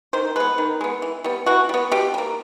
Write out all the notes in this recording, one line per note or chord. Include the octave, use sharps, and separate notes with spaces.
D#3 C5
G#3 B3 B4
D#3
G#3 B3
E3
G3 B3
E3 F#4
G3
B3
B2 G4
G3
A#3